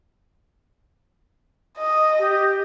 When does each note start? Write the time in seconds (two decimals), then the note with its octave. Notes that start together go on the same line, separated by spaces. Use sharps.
1.78 D#5
2.19 G4